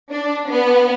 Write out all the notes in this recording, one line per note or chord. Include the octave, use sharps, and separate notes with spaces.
D4
B3